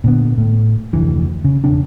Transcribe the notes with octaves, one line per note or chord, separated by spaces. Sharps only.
A#2 D3 B3
A2
F1 D2 E3
C#3
E1 C#3 C4 D4